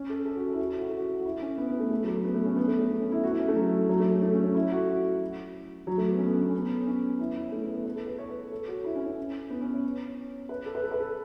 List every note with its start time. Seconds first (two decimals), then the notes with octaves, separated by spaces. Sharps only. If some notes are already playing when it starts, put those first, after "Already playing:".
Already playing: C#4
0.10 A4
0.25 A4
0.36 F#4
0.47 A4
0.53 E4
0.58 F#4
0.69 E4
0.81 F#4
0.89 A4
0.97 F#4
1.20 F#4
1.25 E4
1.41 C#4
1.58 B3
1.69 B3
1.80 A3
1.91 A3
2.04 F#3
2.08 A3
2.24 B3
2.34 A3
2.45 C#4
2.56 B3
2.68 A3
2.79 A3
2.90 B3
3.00 C#4
3.12 E4
3.23 F#4
3.31 E4
3.39 C#4
3.48 A3
3.56 F#3
3.89 F#3
4.00 A3
4.11 A3
4.22 A3
4.33 C#4
4.44 C#4
4.55 E4
4.72 F#4
4.89 F#4
5.87 F#3
5.98 A3
6.09 B3
6.17 C#4
6.25 B3
6.33 C#4
6.42 B3
6.49 C#4
6.57 B3
6.87 C#4
7.19 E4
7.36 E4
7.52 A3
7.63 B3
7.74 B4
7.85 B4
7.96 A4
8.07 B4
8.18 C#5
8.29 B4
8.52 A4
8.68 F#4
8.85 E4
8.95 C#4
9.06 C#4
9.50 B3
9.61 C#4
9.73 C#5
10.49 B4
10.66 A4
10.75 B4
10.83 A4
10.91 B4
11.00 A4